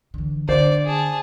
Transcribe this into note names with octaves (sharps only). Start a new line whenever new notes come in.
D3 E3
D3 C5 D5
G#4 A5